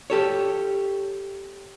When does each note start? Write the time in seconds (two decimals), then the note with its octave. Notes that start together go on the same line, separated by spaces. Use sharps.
0.10 G4 A4 C#5